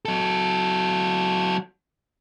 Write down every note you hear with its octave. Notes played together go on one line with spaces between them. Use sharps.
F#3 A4